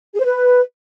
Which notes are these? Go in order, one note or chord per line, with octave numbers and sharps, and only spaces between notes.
G#4
C5
B4